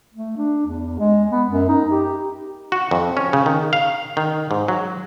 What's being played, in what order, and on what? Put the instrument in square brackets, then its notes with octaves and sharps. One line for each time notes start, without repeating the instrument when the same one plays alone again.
[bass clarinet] A3
D4
E2
G#3
B3
F#2
D#4
G4
[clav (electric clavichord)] F#4
F2
C#4
C#3
D#3
F5
D#3
G#2
F#3